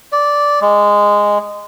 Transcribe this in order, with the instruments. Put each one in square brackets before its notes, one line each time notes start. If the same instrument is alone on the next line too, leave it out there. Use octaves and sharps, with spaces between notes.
[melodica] D5
G#3